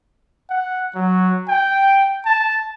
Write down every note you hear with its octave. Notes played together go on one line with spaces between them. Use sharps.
F#5
F#3
G5
A5